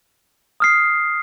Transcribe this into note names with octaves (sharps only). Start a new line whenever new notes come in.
D#6 F6 C7